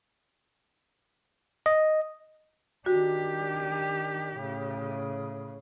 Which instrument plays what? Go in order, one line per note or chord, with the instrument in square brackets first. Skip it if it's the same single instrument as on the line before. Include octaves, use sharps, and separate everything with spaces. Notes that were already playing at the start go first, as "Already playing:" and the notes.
[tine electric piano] D#5
[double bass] D#3 D4 [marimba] F#4 [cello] G4
[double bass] A2 C#3